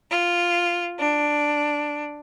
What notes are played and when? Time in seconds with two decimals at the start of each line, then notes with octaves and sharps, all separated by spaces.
0.11 F4
0.99 D4